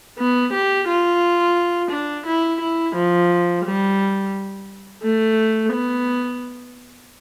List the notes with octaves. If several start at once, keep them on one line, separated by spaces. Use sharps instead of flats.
B3
G4
F4
D4
E4
E4
F3
G3
A3
B3